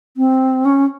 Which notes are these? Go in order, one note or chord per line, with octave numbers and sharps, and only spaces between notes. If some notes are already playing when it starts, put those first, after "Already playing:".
C4
C#4